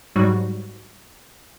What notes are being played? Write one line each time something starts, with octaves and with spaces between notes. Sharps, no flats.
G#2 F#3 G3 F#4